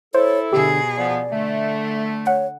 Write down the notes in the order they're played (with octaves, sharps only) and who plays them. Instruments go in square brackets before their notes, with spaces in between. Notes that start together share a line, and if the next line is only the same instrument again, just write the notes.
[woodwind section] E4 A4 [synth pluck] C5 [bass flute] C#5
[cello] B2 G#4 [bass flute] D3 [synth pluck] G4
[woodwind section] F3 B3 [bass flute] D5
[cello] D3 [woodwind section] A3
[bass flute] C#5 [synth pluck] F#5